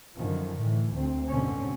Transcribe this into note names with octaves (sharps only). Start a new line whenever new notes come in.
F#2 D3 D#3 F3
A2 E3
D2 C4
F#1 G#2 B2 D3 C4 C#4